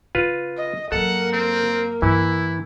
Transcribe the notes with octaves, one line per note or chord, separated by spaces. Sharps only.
C#3 F4 B4
D#5
G2 F#3 A#3 A4 F#5
C4
G2 E3 E4